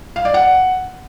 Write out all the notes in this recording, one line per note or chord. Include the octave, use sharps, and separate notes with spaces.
F5
D5
F#5